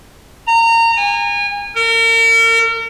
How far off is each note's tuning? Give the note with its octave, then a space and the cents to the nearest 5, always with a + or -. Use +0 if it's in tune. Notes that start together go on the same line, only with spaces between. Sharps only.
A#5 -25
G#5 -30
A#4 -35